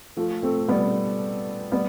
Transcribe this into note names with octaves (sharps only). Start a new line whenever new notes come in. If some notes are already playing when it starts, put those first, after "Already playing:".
F3 A3
A3 C4
G3 B3
G3 B3